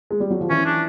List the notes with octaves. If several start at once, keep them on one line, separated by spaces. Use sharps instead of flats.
G#3
G3
F#3
F3
E3 C#4
D4